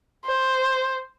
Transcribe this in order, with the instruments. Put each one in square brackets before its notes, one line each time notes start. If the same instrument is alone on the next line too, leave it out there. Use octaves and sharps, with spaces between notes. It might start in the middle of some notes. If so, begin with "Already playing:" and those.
[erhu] C5